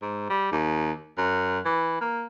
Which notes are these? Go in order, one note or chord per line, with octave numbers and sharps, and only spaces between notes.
G#2
G3
D#2
F#2
E3
A#3